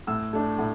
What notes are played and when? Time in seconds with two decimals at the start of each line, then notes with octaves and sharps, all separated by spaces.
0.07 A2 E6
0.33 A3 D4
0.59 A2